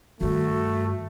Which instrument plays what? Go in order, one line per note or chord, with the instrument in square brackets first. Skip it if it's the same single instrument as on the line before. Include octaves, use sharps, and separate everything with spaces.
[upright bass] G2 D#3 [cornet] A3 [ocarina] F#4